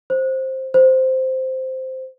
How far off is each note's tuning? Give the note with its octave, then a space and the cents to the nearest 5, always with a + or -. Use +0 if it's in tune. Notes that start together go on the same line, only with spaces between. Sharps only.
C5 +10
C5 -5